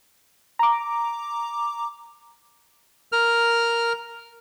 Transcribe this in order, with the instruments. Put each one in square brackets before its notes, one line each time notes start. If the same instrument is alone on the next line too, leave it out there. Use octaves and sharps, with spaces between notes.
[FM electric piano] A#5 D6
[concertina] A#4 F6